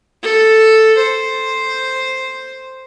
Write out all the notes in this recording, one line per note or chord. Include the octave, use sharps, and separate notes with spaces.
A4
C5